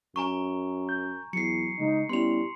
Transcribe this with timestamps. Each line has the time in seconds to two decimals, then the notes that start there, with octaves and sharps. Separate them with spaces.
0.16 F#2 G#5 A#5 C#6
0.89 G6
1.33 E2 F#3 C7 C#7
1.79 C#3 G#3 D#4
2.09 G3 B3 C#4 E4 C6 F7